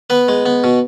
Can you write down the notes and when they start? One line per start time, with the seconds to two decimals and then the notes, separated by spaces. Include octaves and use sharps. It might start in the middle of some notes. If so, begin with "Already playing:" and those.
0.10 B3 B4
0.28 G#3
0.46 B3
0.64 B2